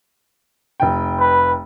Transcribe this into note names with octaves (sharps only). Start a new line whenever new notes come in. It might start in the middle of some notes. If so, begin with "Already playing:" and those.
F1 G5
B4